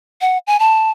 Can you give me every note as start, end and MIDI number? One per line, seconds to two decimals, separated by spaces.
0.21 0.38 78
0.47 0.57 80
0.60 0.91 81